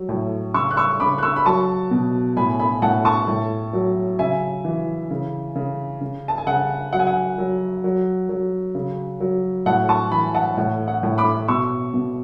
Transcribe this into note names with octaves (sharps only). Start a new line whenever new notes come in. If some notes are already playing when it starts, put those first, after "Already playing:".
Already playing: F#3
A2
C#3 C#6 E6
F#6
C#6 E6
C#3 B5 D6
F#6
C#6 E6
B5
F#3 A5 C#6
B2
A2 G#5 B5
G#5 B5
A2 F#5 A5
A5 C#6
A2
F#3
C#3 E5 G#5
E3
C#3
C#3
C#3
A5
G#5
C#3 F#5
F#3 F#5
G#5
F#5
F#3
F#3
F#3
C#3
F#3
A2 F#5 A5
A5 C#6
E3 G#5 B5
F#5 A5
A2 F#5
F#5
A2
B5 D6
B2 C#6 E6
B2